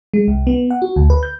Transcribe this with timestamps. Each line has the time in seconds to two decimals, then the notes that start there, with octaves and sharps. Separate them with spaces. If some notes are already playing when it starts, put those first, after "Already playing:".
0.14 G#3
0.28 C2
0.47 B3
0.70 F#5
0.82 F#4
0.96 D2
1.10 B4
1.23 G6